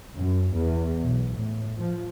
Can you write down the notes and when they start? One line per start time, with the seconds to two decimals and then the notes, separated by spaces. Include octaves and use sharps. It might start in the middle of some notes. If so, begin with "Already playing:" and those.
0.15 F#2
0.55 E2
1.03 B1
1.34 A2
1.77 F3